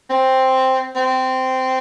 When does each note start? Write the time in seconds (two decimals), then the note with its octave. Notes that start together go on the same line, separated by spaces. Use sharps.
0.10 C4
0.96 C4